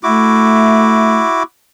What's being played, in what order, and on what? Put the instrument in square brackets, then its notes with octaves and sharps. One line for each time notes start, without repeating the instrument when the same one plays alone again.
[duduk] A3 [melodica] E4 F#4 D6